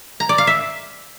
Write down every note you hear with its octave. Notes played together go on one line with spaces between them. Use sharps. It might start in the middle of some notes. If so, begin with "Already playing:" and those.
A#5
D5
F5
E5